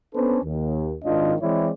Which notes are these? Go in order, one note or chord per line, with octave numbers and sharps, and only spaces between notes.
B3 C#4 D4 A4 B4 C5
D#2
G#1 D#3 C4 D4 F4 D#5
E3 G#3 C4 E4 C#5 D5